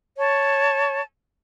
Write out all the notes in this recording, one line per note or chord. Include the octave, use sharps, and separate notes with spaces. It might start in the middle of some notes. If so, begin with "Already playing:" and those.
C#5 A5